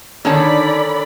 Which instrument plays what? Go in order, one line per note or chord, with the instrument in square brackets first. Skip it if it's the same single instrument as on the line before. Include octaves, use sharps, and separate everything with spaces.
[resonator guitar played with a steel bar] D3 D#3 C#4 [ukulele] D#4 C#5 A5 [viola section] D5 B5